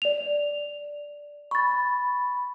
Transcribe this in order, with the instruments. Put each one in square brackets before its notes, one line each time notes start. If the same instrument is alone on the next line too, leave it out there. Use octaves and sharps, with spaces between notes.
[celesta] D5 F7
[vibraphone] B5 [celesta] C#6 A6